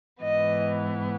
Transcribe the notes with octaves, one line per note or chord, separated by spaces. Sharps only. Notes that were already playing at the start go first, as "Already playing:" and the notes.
G#2 E3 B3 D#5